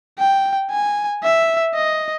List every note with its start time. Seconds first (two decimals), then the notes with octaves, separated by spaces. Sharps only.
0.19 G5
0.71 G#5
1.23 E5
1.74 D#5